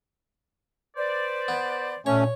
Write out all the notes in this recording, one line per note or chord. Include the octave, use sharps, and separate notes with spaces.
B4 C5 D5
B3
A#2 A3 C#4 C#5